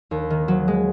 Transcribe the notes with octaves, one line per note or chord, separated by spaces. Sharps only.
D#2
D#3
F#3
G#3